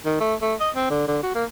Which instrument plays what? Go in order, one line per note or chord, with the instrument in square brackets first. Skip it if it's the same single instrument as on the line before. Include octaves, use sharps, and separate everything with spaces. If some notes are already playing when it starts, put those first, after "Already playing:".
[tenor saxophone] D#3
A3
A3
D#5
C4
D3
D3
F#4
A#3